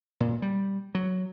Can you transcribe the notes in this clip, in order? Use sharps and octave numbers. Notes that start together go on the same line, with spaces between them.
A#2
G3
F#3